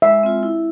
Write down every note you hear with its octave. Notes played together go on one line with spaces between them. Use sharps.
G#3 E5
C4 F4
E4